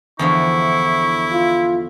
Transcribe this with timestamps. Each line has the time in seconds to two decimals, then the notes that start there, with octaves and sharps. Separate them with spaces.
0.19 E2 D3 F3 E4 C#6
1.33 F4